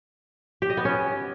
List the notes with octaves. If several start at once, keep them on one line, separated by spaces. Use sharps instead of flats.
G4
D#5
B3
C#4